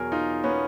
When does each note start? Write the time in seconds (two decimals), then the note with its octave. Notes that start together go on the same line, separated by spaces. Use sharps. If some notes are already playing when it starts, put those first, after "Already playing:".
Already playing: E2 B2 F#3 G#4 A#4
0.12 D#4 F4
0.44 B3 C#4